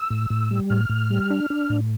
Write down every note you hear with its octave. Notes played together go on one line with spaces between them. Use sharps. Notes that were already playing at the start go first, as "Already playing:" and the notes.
Already playing: E6
A2
A2
G3
A2 F6
A2
G3
D4
D4
A2